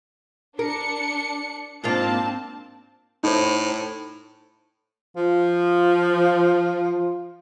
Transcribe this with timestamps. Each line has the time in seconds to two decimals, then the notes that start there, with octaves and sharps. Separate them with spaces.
0.59 D4 A#4 C#7
1.84 G#2 A#3 C4 D4 F4 A5
3.24 A2 D#4 C5
5.16 F3 F4